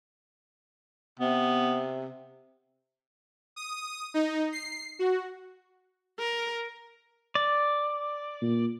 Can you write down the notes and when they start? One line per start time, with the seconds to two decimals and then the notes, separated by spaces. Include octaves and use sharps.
1.20 C3 B3
3.56 D#6
4.14 D#4
4.52 C7
4.99 F#4
6.19 A#4
7.35 D5
8.41 A#2